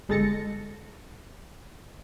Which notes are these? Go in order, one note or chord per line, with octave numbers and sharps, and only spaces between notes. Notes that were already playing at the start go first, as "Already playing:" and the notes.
G1 G#3 A4 A6 A#6 C#7